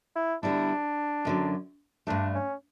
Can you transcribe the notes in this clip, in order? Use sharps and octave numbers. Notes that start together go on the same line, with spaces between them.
E4
D3 G3 B3 D4 E4
F#2 D3 F#3
G2 D3 A3 D4
C#4